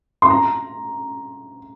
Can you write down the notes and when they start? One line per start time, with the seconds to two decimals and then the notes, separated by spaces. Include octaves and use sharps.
0.22 C6
0.30 A#5